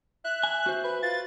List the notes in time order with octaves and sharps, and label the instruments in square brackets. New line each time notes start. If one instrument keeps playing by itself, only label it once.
[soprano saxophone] E5 [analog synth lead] F#6
[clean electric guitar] G#5
F#4 C5
[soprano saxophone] B4
[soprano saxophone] F4 [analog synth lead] A6